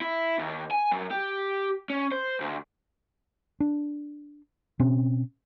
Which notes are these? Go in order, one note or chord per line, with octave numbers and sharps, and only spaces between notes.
E4
D#2
G#5
F#2
G4
C#4
C5
D2
D4
B2 C4 C#4